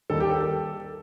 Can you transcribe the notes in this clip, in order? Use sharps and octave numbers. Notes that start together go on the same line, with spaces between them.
D#2 D#3 G3 A#3 A4
G4
A4
A4